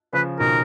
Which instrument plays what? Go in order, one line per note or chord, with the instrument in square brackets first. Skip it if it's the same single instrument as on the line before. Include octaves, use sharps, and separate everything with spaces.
[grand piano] C#3 F3 [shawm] B4
[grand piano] B2 D#3 [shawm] A#4